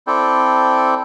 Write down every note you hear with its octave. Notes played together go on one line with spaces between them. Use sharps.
C4 E4 A4 D5 G5